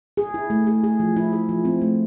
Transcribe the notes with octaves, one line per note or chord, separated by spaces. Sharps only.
G#4
E4
A3
G#4
G#4
F3
E4
G#4
F3
C4
A3